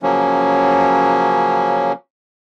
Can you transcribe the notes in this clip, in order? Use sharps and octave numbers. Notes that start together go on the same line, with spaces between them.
C#3 F3 F#3 A#3 C#4